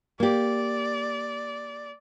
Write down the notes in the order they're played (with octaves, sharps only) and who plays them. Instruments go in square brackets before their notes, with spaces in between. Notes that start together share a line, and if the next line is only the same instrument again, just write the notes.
[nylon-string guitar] A#3 G4 [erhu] D5